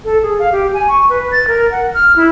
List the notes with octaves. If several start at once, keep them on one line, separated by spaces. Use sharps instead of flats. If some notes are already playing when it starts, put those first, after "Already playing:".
A4
G#4
F5
G4
G#5
C#6
B4
A6
A#4
F#5
F6
E4